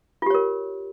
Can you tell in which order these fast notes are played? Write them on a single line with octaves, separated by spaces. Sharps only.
F4 G4 C#5 A#4